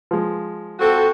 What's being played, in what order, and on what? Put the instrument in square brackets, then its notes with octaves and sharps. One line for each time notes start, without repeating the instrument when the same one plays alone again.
[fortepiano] F3 G#3
[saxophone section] C4 F4 F#4 [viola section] A4